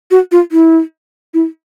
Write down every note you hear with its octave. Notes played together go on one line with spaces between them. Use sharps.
F#4
F4
E4
E4